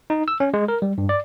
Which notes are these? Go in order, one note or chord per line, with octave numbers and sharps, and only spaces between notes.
D#4
E6
C#4
G#3
A#4
G3
G2
D5